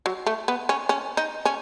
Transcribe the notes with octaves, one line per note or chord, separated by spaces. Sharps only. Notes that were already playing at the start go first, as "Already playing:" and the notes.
F#3
A3
B3
C#4
C#4
D#4
C#4